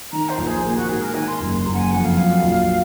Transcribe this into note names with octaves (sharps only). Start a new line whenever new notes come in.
D#3 A#5
C5
A#1
G#4
A#3
G#4
F#4
G#2 G#4
A#4
D#3 G#5
C6
F#1
C6
F#1 A#5
F#5
G#5
F2 F#5
F5
F#3
A#1